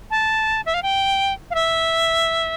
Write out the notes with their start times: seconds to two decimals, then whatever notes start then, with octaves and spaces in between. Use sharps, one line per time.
0.11 A5
0.66 E5
0.74 F5
0.83 G5
1.51 F5
1.55 E5